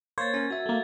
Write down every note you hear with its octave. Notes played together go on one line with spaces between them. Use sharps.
A#3 C5 C#5 G#6 A6
C#4 A#4
F#4 E5
A3 A#3